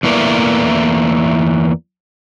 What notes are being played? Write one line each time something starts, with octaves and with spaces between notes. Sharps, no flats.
E2 A#2 E3 A3 A#3 D5